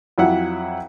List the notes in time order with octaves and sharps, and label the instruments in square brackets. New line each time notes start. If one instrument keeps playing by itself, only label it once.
[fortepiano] F2 F#3 E4 F#5